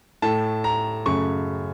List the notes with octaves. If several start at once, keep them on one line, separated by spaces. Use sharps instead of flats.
A2 A3 A5
A#5
F#2 C#3 A3 C#6